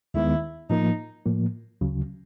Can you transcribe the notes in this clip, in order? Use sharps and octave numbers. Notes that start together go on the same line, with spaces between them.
D#2 D#3 G#3 B3 E4
A2 F3 A#3 D#4
A2 F3 A#3
D2 C#3 F#3